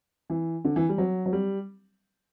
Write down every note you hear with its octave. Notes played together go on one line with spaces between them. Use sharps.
E3
D3
E3
G3
F#3
F#3
G3